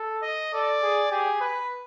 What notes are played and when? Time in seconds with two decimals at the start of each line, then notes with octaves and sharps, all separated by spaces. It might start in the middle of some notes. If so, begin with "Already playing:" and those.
Already playing: A4
0.23 D#5
0.53 A4 D5
0.83 G#4
1.11 G4 G#4
1.41 B4